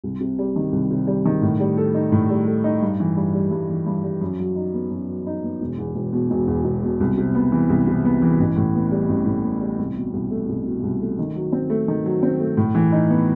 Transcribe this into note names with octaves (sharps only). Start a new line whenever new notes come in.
C2
C3
G3
D#3
C2
C3
G3
D#3
A2
G3
A4
D#4
A2
G3
A4
D#4
G2
E3
G2
G3
G2
E3
G2
G3
F#2
F#3
D#4
B3
F#2
F#3
D#4
B3
E1
E2
E1
B2
E1
E2
E1
B2
C2
C3
B3
E3
C2
C3
B3
E3
A1
A2
B3
G3
A1
A2
B3
G3
C2
B2
C2
A3
C2
B2
C2
A3
D#3
F#3
C4
A3
D#3
F#3
C4
A3
A2
E3
D#4
B3